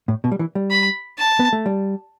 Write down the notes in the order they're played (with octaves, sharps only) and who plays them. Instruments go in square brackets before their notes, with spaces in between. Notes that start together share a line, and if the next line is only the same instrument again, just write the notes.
[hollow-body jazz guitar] A2
B2
G3
E3
G3
[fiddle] B5
A5
[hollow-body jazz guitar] B3
A3
G3